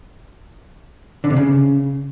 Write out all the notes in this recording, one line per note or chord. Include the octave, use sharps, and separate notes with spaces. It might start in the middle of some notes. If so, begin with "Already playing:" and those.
D3
C3
C#3